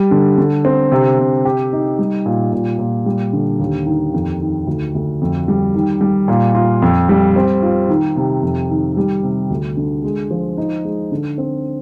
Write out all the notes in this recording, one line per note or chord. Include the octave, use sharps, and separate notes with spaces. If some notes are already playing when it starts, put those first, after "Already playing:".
Already playing: G3
D3
D3
C4
C3
C3
G4
D#4
G3
A#2
A#2
A#2
G3
D3
D#2
D#3
F2
D#3
D2
D2
F2
G3
D#3
G3
A#2
F4
F2
G3
C4
F4
D#3
C3
F2
D#3
G3
C3
D2
D3
G#3
F3
D#4
G#3
D3
C4